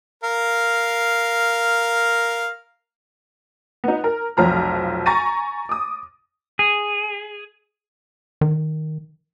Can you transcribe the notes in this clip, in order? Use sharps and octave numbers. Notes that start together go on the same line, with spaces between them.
A#4 F5
B3 D#4
A#4
F1 B1 F3 A#5 F6
G#5 A#5 C#6 A6 A#6 D#7
D6 D#6
G#4
D#3